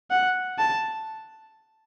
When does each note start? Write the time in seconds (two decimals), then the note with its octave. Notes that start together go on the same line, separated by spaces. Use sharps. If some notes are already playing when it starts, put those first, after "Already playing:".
0.11 F#5
0.58 A5